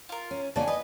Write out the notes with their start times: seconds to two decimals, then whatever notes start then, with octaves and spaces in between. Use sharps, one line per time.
0.09 F4 A#4
0.31 C#4
0.56 C#3 A#3 D4 D5 F#5 G#5
0.68 B4 D#5